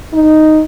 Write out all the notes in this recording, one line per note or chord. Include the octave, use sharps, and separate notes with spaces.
D#4